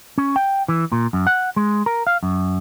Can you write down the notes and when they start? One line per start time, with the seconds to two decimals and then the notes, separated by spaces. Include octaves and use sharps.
0.18 C#4
0.36 G5
0.68 E3
0.92 A#2
1.13 F#2
1.27 F#5
1.56 G#3
1.86 A#4
2.07 F5
2.23 F#2